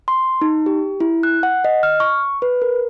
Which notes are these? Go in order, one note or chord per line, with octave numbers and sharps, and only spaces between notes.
C6
D#4
G4
E4
F#6
F#5
D#5
F6
C#6
B4
A#4